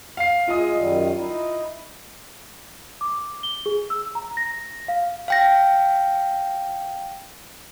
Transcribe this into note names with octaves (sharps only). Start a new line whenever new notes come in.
F5 C7
G#3 F4 G#4 D#5 E5 D#6
F#2 D#3 G3
D#4 E4
D6
G7
G#4
E6
A#5
A#6
F5
F5 G5 A#6